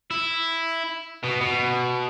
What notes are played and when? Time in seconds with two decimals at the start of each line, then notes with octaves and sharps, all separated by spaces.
0.11 E4
1.24 B2
1.41 B2